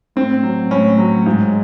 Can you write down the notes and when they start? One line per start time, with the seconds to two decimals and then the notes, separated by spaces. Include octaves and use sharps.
0.16 A2 C4
0.43 F#3
0.71 A2 C#4
0.98 F#3
1.26 G#2